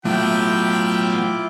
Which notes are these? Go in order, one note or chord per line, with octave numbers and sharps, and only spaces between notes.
A2 F#3 B3 E4 F4 G5 D6